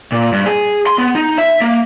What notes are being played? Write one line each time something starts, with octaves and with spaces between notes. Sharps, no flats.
A#2
G2
G#4
C6
B3
D#4
E5
A#3